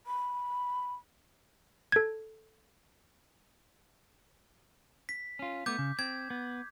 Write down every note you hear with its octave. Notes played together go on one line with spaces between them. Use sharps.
B5
A4 G#6
B6
C#4 F4
A3 B3 D6 G6
C#3
C4 G#6
B3